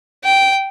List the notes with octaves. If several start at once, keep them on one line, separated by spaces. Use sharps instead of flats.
G5